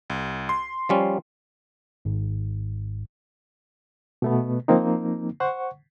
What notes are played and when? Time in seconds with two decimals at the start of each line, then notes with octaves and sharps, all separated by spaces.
0.10 C2
0.49 C6
0.89 F3 G3 C#4
2.05 G#1 G#2
4.22 B2 A3 B3
4.68 F3 A#3 C4 D#4
5.40 C5 F#5 C#6